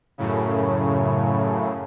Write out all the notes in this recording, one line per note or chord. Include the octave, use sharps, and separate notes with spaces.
F#2 A2 C#3